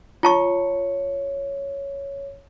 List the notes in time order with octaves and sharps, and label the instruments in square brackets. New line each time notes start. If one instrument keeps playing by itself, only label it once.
[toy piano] F4 A5 C#6 [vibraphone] C#5